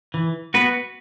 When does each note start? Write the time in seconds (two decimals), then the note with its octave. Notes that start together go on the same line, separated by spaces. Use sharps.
0.14 E3
0.54 B3 F#4 B4